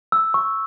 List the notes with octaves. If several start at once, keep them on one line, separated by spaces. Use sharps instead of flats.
E6
C#6